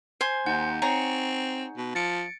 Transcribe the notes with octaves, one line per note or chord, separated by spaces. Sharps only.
C5 G#5 C6
D#2 D#4 F#5 G6
C4 G#4 C#5 A#5
B2
F3 A6 C#7 D7